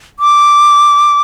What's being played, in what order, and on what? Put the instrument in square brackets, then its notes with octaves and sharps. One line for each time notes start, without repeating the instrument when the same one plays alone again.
[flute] D6